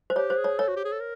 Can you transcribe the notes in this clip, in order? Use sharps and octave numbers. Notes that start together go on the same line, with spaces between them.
C5
G4 C#5
C5
G#4
C#5
A4 C#5
F#4
G4
G#4
A4
A#4